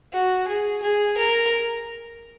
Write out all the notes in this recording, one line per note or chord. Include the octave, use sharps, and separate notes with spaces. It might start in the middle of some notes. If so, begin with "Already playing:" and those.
F#4
G#4
G#4
A#4